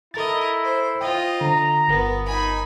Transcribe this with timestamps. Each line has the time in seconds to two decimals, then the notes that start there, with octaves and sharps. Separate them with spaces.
0.14 E4 A4 A#4 D#5 A6
0.64 C5
1.01 F4 C5 D#5 G5
1.41 D3 A#5
1.88 G1 B3 A#4 A#6
2.26 D#4 G#5 B5